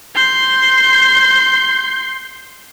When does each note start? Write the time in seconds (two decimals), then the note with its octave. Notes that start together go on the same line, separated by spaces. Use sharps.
0.15 C6 G6